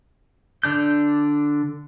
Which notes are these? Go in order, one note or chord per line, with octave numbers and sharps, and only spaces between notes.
D3 D4 G6